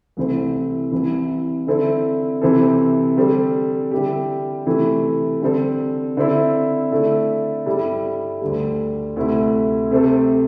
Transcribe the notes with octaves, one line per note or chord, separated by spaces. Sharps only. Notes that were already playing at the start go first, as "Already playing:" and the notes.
C2 C3 E3 A3 C4
C2 C3 E3
D3 C4 E4 A4
C3 E3 C4 A4
D3 G3 C4 A4
D3 G3 E4 G4
C3 E3 A3
D3 G3 C4 A4
D3 C4 E4
D3 A3 E4 A4
G2 G3 E4 A4
D2 D3 G3
D2 C3 A3 E4
C3 A3 C4 A4